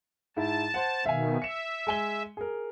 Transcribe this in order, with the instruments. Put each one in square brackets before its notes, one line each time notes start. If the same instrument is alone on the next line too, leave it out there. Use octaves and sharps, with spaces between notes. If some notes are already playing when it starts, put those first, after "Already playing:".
[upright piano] G#2 E4 [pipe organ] A5
[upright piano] C5 F#5
[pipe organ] B2 D#3 [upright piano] E5 F5 G#5
[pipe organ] E5 [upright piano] C#7 E7
[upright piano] G#3 G#5 G7
G#4 A#4